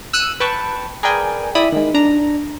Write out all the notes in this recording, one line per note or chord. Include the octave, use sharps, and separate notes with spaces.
E6 F#6 C#7 D#7
B4 G5 A5 C#6
G#4 A#4 B4 D5 G5 G#5
E4 D5 B5 D#6
D#3 G#3
D4 A#5